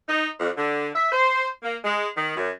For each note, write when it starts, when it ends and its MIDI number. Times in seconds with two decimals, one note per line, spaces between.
0.08 0.27 63
0.39 0.50 41
0.56 0.87 50
0.94 1.09 76
1.11 1.46 72
1.63 1.76 58
1.84 2.07 56
2.16 2.33 51
2.36 2.50 42